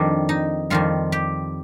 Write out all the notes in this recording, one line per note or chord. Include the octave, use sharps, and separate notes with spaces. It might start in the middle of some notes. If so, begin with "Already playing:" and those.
Already playing: F2 D#3 G3 D4
D#4
F2 D#3 G3 F4
G4